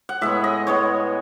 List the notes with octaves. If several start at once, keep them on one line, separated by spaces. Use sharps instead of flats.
F#5
A2 G#3 B3 E5
D#5
A2 G#3 B3 C#5